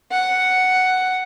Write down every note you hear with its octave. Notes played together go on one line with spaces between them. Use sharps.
F#5